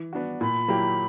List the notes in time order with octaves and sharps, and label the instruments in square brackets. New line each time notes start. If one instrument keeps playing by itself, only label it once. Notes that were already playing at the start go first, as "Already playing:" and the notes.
Already playing: [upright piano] E3
B3 D4 F#4
[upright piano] A#2 [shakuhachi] B5
[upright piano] F#3 A#3 E4 G4